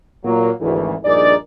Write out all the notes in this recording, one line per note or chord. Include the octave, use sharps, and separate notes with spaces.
A#2 F#3 A#3
G#1 D2 E3
A#1 G2 D#4 G#4 A#4 D5